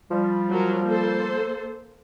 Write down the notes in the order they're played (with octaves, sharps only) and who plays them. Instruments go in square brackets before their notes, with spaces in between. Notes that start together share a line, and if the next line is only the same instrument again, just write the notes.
[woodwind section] F3 G3
[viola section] F#3 A#4
A#3 A4 C5